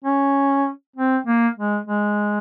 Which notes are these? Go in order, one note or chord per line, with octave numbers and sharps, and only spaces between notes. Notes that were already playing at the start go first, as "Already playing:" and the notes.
C#4
C4
A#3
G#3
G#3